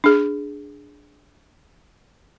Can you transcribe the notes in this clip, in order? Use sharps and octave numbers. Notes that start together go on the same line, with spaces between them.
D4 G#4